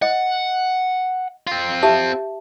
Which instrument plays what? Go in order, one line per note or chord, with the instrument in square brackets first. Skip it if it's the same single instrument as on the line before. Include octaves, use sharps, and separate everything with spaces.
[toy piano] D#5 [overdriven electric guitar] F#5
[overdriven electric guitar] C4 F4
[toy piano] G4 E5 A5